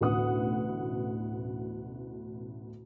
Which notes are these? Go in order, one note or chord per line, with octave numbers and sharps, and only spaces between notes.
A1 D2 B2 B4 F#5 D#6